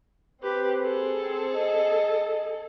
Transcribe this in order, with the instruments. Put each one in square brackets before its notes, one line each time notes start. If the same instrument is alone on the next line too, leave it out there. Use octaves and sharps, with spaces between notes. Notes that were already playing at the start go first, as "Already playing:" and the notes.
[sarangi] C4 [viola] G4 B4
[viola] G#4 A4
[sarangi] C4
D#5